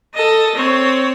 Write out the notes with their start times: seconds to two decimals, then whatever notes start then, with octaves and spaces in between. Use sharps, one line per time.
0.15 A4 D#5
0.56 C4 C#5